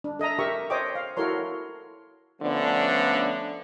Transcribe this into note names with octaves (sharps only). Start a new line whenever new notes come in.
D4
A4 D#5 E5 A#5
G4 A#4 E5 C#6
C5 C#5 D#5 G5 D6
F5
E4 F#4 A4 A#4 C#5 C6
D3 F3 A3 B3 C#4 D4